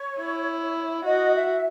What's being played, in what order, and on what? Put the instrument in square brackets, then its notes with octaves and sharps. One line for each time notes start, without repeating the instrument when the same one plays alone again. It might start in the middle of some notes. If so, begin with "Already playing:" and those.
Already playing: [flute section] C#5
[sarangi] E4
[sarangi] F#4 [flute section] D#5
[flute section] E5